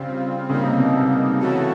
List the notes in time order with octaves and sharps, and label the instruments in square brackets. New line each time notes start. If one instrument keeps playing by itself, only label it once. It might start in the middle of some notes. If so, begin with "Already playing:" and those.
Already playing: [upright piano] C#3 [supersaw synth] G3 C4 F4
[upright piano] C#3 [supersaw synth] G3 A#3 D#4
[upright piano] C3
B2
C3
[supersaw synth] E3 A3 C#4 F#4 A4